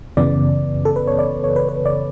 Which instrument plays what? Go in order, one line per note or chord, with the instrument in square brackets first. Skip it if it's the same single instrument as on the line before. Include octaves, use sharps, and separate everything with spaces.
[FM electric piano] F#2 C#3 E3 B3 D5
A4
B4
C#5
D5
C#5
B4
B4
D5